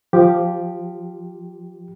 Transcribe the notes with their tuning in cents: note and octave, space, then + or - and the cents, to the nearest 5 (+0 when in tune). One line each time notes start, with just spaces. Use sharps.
F3 +0 G4 +0